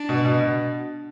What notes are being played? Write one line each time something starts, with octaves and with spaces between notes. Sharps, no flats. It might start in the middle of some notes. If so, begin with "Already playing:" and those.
Already playing: D4
B2
B2
B2